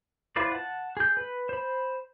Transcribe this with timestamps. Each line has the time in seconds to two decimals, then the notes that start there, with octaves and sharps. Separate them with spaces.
0.36 E4 F4 B4 C5 D5
0.52 F#5 A5
0.97 G#4 G6
1.17 B4
1.49 C5 B5